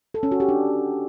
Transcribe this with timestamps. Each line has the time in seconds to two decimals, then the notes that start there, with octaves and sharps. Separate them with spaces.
0.14 A4
0.23 C#4
0.32 F#4
0.40 G4
0.49 D4